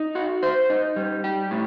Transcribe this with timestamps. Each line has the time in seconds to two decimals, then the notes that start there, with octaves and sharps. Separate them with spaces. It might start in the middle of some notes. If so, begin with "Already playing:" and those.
Already playing: D#4
0.15 F#4
0.43 C5
0.70 D#4
0.96 G3
1.24 G4
1.51 A2